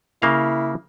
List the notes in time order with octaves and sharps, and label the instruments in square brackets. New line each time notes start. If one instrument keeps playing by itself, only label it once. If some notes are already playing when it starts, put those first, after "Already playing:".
[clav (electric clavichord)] C#3 A#3 F5 [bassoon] E4